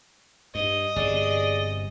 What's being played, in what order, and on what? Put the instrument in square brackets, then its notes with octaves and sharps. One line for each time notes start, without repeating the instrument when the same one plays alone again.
[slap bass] G2 [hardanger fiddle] D#5
[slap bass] G1 C3 [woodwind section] G#4 D5